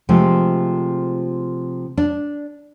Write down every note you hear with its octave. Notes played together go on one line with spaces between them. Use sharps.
C3 F3 G#3 A3
D4